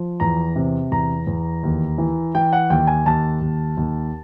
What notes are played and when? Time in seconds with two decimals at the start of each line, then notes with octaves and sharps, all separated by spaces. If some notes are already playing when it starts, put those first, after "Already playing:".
Already playing: F3
0.20 E2 A#5
0.56 C3
0.91 E2 A#5
1.27 E2
1.63 D#2
1.98 E3
2.35 E3 G5
2.53 F#5
2.70 D#2 G5
2.87 G#5
3.06 D#2 A5
3.41 D#2
3.77 D#2